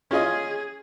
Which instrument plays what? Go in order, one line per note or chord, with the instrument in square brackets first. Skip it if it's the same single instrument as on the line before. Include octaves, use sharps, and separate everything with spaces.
[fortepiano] C#4 F4 D#5 [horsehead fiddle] G#4